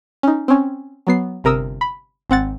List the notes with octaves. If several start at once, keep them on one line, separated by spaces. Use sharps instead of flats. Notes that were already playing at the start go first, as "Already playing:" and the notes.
C#4 D#4
C4 C#4
F#3 B3 C7
G1 C3 A#4 D#6 E6
B5
G#1 C4 F#5 A6